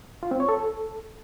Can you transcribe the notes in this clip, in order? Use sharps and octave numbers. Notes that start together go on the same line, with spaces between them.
F4
C4
C#5
A4